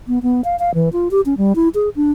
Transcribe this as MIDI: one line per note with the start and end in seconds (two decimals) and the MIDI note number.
0.08 0.19 59
0.23 0.41 59
0.44 0.56 77
0.59 0.74 77
0.74 0.89 52
0.93 1.08 65
1.11 1.21 67
1.26 1.34 61
1.38 1.55 55
1.56 1.69 64
1.75 1.89 68
1.96 2.12 62